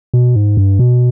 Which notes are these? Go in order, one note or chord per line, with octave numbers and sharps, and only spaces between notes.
B2
G#2
G2
B2